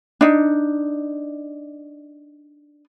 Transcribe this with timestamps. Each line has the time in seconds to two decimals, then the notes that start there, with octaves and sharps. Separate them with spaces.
0.21 D4 D#4